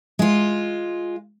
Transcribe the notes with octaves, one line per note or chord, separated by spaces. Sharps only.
G#3 F4